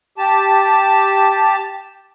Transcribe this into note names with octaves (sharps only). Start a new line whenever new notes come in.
G4 A5